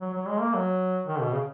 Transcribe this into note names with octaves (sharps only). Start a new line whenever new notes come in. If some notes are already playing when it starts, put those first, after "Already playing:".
F#3
F#3
G#3
A#3
F#3
D#3
B2
C#3